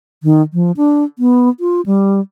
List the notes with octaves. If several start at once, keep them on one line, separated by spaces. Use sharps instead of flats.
D#3
F3
D4
B3
F4
G3